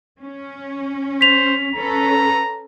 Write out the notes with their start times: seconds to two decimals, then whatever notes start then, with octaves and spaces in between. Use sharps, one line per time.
0.21 C#4
1.21 C5 B6 F7
1.75 C#4 A4 B4 A#5